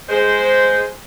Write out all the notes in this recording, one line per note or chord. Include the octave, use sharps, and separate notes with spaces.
G#3 C5